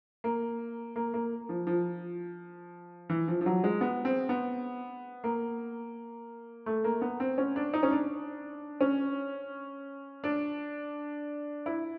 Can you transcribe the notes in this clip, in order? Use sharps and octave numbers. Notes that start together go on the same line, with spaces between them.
A#3
A#3
A#3
F3
F3
E3
F3
F3
F#3
G#3
B3
C4
B3
A#3
A3
A#3
B3
C4
C#4
D4
D#4
C#4
D4
C#4
D4
E4